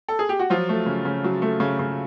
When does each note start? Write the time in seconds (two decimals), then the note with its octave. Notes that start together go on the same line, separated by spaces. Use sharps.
0.08 A4
0.19 G#4
0.29 G4
0.39 F#4
0.50 F3 F#3 F4
0.69 A3
0.86 C#3
1.05 C#3
1.24 F#3
1.42 A3
1.60 C#3
1.79 C#3